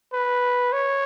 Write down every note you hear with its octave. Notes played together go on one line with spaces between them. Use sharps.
B4
C#5